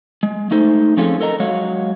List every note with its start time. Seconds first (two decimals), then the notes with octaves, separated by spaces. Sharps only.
0.23 G#3
0.51 A3 D#4 A4 C5
0.97 F3 C4 C#4 F4 G#4 A4
1.21 A4 A#4 D#5 A#5
1.40 F#3 G#3 C#5 F5